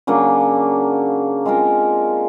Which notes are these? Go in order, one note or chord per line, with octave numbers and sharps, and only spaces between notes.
C#3 F#3 A#3 D4
G#3 C4 F4 A#4